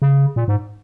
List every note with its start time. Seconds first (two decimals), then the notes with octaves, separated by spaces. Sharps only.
0.02 C#3
0.36 A#2
0.48 G#2